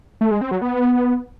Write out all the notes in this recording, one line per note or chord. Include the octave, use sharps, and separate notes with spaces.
A3
G#3
C4
F#3
B3